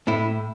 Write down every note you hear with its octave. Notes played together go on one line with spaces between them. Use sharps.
A2 E4